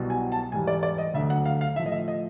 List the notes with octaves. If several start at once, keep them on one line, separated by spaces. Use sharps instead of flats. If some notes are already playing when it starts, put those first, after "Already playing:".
Already playing: C2 B2 F#3
G#5
A5
G#2 E3 G3 G#5
D5
D5
D#5
D2 D3 F#3 E5
F#5
F5
F5
A2 F3 E5
D#5
E5
D#5